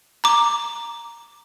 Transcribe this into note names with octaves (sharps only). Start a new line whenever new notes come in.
A#5 D6